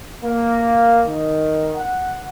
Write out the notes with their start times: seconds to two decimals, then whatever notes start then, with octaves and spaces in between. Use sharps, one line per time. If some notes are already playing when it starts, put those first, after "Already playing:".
0.24 A#3
1.06 D#3
1.76 F#5